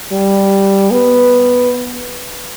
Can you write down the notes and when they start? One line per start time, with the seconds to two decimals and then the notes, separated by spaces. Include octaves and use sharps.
0.12 G3
0.90 B3